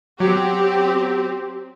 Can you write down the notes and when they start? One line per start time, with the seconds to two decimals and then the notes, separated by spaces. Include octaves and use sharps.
0.20 F#3 C4 G4